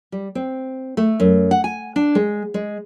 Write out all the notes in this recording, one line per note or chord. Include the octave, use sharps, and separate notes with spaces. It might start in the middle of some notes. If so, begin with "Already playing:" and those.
G3
C4
A3
F#2
F#5
G#5
D4
G#3
G#3